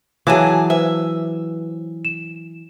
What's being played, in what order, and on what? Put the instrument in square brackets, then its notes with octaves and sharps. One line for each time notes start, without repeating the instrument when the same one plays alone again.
[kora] E3 F#3 [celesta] F#4 C#5 F5 [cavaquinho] G#4 A5 D6
[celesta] B4 C5 [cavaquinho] E5
[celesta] E7